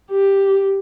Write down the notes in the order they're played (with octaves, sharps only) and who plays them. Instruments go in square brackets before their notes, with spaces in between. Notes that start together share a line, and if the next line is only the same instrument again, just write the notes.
[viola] G4